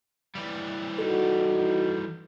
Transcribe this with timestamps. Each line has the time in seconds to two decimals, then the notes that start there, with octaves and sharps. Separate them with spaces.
0.35 E3 G3
0.98 D#4 F#4 A4